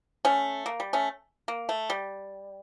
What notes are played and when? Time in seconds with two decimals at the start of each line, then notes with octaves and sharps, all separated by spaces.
0.25 A3 C#4
0.66 A#3
0.80 G3
0.93 A3 C#4
1.48 A#3
1.69 A3
1.90 G3